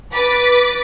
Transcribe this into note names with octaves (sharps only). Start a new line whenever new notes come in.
B4 D6 A6 B6